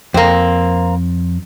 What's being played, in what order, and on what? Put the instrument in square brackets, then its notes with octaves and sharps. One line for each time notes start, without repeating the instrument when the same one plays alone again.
[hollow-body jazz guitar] F2 [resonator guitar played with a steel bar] A#3 C4